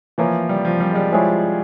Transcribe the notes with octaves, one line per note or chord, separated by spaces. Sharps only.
E3 F3 A#3 E4 A#4 C#5
G3
F3
G3
G#3
G3
F3 G#3 E4 G#4 C#5